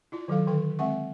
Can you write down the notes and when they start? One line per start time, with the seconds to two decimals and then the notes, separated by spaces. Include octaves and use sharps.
0.12 E4 F4 D5
0.28 D#3 F#3 A4 F5
0.47 D3 D#3 A4 G5
0.79 G#3 C4 E5 F#5 C#6